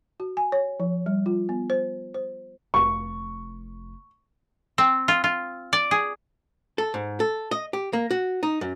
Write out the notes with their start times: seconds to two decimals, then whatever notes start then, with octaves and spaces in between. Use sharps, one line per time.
0.20 F#4
0.37 G#5
0.52 C#5
0.80 F3
1.06 G3
1.26 F4
1.49 B3
1.70 C5
2.14 C5
2.74 F1 C#6
4.78 C4
5.08 F4
5.24 F4
5.73 D5
5.91 G#4
6.78 A4
6.94 G#2
7.20 A4
7.51 D#5
7.73 G4
7.93 A#3
8.11 F#4
8.43 D#4
8.61 F#2